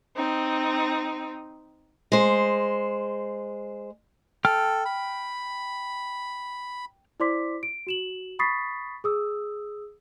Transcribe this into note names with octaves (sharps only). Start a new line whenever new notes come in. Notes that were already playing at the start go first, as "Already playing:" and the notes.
C4 D#4
G#3 C5
A4 G5 F6
B5
E4 C5 D5 C6 D6 B6
D7
F#4 E7 F#7
B5 C#6 D#6 A6 B6 C7
G#4 D#6 E6